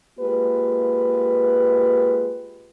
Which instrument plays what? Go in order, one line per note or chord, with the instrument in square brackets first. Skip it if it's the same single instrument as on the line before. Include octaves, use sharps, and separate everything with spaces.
[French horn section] G#3 A#3 F4 G4 B4